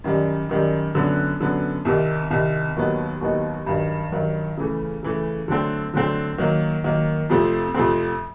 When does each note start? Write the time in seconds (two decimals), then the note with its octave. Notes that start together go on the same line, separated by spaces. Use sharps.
0.04 F#2 D#3 G3
0.49 F#2 D#3 G3
0.95 F#2 D3 F#3 B3
1.40 F#2 D3 F#3 B3
1.85 C2 C3 D#3
2.31 C2 C3 D#3
2.76 D#2 D#3 F#3 B3 D#4
3.21 D#2 D#3 F#3 B3 D#4
3.66 G2 D#3 F#3
4.12 G2 D#3 F#3
4.57 C#3 E3 A3
5.03 C#3 E3 A3
5.48 D3 F#3 A3 C4
5.93 D3 F#3 A3 C4
6.38 D#3 F#3 A#3
6.84 D#3 F#3 A#3
7.29 F2 C3 F3 A3 C4
7.75 F2 C3 F3 A3 C4